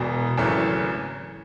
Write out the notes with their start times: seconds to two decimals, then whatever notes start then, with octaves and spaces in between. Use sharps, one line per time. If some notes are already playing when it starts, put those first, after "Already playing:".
Already playing: E1 E2 B2
0.38 G#1 F#2 C#3 E3 A3